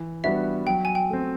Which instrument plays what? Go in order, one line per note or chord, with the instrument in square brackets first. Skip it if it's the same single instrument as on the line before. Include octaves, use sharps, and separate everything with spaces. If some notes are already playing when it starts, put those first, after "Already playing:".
Already playing: [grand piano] E3
[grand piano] G3 B3 D4 F#4 [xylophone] E5
[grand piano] F#3 [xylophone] G5
[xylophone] G#5
G5
[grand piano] A3 C4